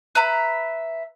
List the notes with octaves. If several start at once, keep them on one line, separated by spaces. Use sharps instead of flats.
B4 E5 A#5 B5